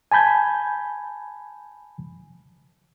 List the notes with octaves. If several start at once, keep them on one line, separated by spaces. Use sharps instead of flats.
G#5 A5 B5 G6 G#6